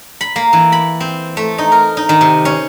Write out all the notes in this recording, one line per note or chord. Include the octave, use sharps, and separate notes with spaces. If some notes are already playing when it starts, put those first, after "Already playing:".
B5
A#3
E3
B5
C4
A3
D#4
A#4
D#4
D#3
C3
C#4